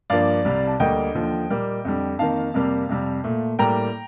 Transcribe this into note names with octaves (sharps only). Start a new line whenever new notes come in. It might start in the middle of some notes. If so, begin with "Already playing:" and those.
G2 F3 A#3 D5 F5
C2 C3 G3
A5
D2 D3 G3 A#3 D#5 G5
D#2 D3 F3
A#2 G3 A#3
F2 D3 G3
F2 D#3 A#3 F5 A5
F2 C3 G3 A#3
F2 C3 G3
A#2 A3
A2 G3 A#3 G5 A#5